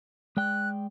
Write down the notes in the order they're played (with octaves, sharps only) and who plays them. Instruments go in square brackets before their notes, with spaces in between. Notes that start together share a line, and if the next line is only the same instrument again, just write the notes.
[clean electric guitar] G#3 D5 G5 [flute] F#6